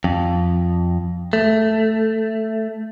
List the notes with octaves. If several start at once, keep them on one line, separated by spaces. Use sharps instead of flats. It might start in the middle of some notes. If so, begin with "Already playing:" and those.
F2
A3